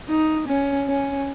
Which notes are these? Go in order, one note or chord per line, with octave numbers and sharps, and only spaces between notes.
D#4
C#4
C#4